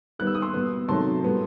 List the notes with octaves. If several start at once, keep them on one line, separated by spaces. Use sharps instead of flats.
D#3 G3 B3 F#6
E6
D#6
C6 E6
B2 G3 B3
C3 D#3 F#3 A3 A5 C6
A2 G3 B3